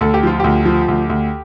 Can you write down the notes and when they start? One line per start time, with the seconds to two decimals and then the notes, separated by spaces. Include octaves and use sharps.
0.01 D2 A4
0.14 G4
0.23 F3 F4
0.40 D2 G4
0.66 F3
0.88 D2
1.10 D2